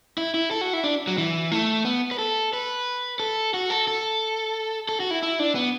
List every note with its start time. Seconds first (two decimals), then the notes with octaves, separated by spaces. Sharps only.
0.18 E4
0.34 E4
0.51 A4
0.61 F#4
0.73 E4
0.84 D4
1.07 F#3
1.18 E3
1.52 A3
1.85 B3
2.11 B4
2.18 A4
2.53 B4
3.20 A4
3.54 F#4
3.70 A4
3.88 A4
4.89 A4
5.00 F#4
5.11 E4
5.23 E4
5.39 D4
5.55 B3